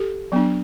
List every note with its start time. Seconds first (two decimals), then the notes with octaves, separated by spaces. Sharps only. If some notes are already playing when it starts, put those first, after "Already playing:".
Already playing: G4 A4
0.32 F#3 B3 D4